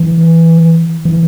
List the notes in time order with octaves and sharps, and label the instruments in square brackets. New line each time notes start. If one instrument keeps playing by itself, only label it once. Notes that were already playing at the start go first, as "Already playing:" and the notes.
Already playing: [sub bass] E3
E3